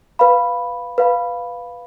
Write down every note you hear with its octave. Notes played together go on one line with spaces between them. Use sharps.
B4 F5 B5
B4 F5 B5